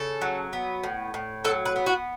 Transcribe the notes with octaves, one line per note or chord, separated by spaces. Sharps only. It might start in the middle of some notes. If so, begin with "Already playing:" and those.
Already playing: C#3 A4
F#3
B3
A2
A2
F#3 A4
B4
B3
F#4